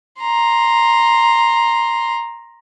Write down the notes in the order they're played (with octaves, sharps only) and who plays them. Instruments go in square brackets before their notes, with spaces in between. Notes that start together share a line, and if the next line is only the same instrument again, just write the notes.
[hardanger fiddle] A#5 C6